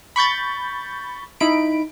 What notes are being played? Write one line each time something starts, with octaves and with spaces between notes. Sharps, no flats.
B5 C#6 G6 A6
D#4 E4 B5 D7